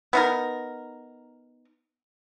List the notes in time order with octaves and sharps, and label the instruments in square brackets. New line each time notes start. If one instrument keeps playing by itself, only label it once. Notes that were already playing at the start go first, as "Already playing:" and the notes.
[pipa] B3 D#4 A#4